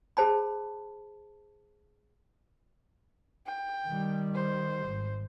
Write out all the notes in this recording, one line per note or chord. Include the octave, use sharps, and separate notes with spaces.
G#4 C5 A5 B5
G5
D#3 G3
C5
G#1